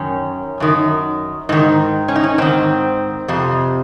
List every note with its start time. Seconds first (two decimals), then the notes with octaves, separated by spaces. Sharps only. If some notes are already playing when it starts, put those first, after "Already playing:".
Already playing: F#2 D#3 C#4
0.60 F#2 D#3
1.49 G#2 D#3 D#4
2.08 C#4
2.16 D#4
2.24 C#4
2.38 G#2 D#3 C4
3.28 F2 C3